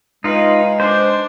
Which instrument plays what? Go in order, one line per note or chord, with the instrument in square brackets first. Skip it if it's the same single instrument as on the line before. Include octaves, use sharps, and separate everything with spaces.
[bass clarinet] G#3 [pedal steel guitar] D#4 F4 [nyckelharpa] B4
[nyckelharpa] D4 [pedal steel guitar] C5